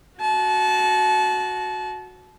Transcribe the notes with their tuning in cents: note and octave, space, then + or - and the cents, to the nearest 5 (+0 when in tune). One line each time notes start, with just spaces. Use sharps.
F#4 -10 A5 -30